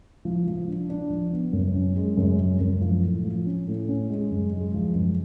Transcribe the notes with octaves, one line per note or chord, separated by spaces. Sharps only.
F3
F3
D4
D4
F3
B3
F#2
C#4
G#3
F#2
G#3
F#2
F3
A2
F3
C#4
A2
C#4
G#3
F#2
G#3
F3
F#2